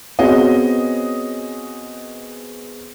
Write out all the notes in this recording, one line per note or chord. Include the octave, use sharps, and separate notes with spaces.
B3 C4 F#4 G#4 C#5 D#5